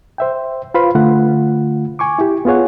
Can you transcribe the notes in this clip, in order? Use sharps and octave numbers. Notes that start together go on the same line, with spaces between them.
C5 E5 G5
F4 B4 C5 F5 B5 C6
D3 A3 F4 F#5
G#5 C#6 D6
E4 G4
B3 F4 G#4 C#5 F#5